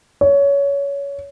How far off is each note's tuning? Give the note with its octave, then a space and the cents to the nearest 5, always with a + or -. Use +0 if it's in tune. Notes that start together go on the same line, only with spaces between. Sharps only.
C#5 +20